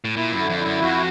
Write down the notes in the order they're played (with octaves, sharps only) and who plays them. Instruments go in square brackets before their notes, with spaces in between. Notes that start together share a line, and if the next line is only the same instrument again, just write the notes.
[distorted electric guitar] A2
[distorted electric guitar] A#2 [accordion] E4
[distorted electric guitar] F#2
[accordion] D3
[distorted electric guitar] F2
[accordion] E4
[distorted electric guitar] F#2
[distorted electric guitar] F2 [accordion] F#4